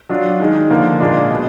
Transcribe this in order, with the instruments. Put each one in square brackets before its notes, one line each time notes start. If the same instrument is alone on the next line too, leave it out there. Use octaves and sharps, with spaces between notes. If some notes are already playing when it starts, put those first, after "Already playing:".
[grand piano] F#3 D4 F4
D#3 G#3 D#4
D3 F3 A#3 F4
A#2 G#3 D4 F4
B2 G#3 B3